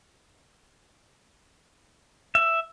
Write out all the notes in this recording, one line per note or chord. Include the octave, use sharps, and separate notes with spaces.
E5